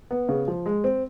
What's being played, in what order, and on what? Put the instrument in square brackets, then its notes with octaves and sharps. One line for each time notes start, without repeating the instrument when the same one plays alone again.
[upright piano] B3
C#3
F3
G#3
C4